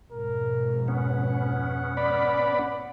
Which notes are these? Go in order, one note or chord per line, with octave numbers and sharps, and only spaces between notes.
F2 G#2 B2 A#4
B3 C#4 F#5
D5 B5